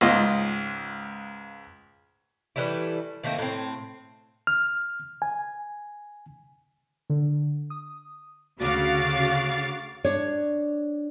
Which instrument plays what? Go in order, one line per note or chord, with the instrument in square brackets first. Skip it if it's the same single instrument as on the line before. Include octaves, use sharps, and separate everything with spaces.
[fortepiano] C#2 G#2 F4 D#5
[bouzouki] E3 G3 A3 E4
D#3 A3 A#3 C4
A2 C4
[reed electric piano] F6
G#5
[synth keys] D3
D#6
[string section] D2 C#3 F#4 F5 D6 A6
[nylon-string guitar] D4 C#5